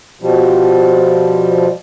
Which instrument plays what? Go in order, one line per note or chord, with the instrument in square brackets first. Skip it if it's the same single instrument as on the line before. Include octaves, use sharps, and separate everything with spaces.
[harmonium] B2 F3 G3